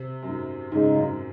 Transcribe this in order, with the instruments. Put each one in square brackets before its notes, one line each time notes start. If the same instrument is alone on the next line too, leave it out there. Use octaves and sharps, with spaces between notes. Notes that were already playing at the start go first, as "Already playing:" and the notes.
Already playing: [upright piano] C3
F#2
G#2
[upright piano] G#2 [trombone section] C#3 G#3 D#4
[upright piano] F#2
G#2